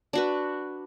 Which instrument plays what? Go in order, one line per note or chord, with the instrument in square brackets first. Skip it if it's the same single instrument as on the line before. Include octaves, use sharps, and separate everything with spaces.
[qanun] D4 F#4 B4